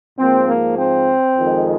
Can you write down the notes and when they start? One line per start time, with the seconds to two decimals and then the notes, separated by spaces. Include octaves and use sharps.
0.18 G#2 F3 A#3 C4
0.48 A#3
0.78 C4
1.38 F2 D#3 G#3